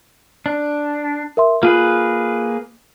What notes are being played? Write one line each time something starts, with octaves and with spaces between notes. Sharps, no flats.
D4
A#4 E5 C6
A#3 F4 G#4 B4